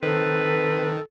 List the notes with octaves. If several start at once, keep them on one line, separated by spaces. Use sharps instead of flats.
D#3 C4 A4 B4